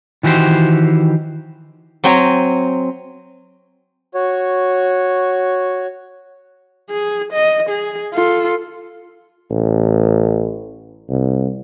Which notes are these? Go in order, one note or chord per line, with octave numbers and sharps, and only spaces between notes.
D#3 E3 F#4 G4 C5
F#3 C4 G5 G#5 A#5
F#4 C#5
G#4
D#5
G#4
F4 A4
A1
C2